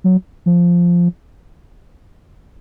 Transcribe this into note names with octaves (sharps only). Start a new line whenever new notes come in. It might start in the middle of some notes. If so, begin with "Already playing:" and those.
F#3
F3